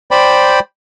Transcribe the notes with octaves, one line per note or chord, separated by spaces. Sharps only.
C5 D5 G5 B5